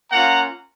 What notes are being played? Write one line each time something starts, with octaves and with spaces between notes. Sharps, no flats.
A#3 C#4 F4 F#5 A#5